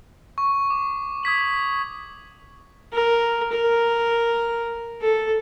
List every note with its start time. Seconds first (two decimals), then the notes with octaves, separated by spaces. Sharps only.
0.38 C#6
0.70 D6
1.23 D#6 G#6 B6 F#7
2.93 A#4
3.52 A#4
5.02 A4